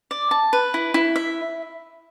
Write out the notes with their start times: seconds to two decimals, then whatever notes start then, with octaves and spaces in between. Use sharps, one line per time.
0.11 D5
0.31 A5
0.53 B4
0.74 E4
0.94 E4
1.16 E5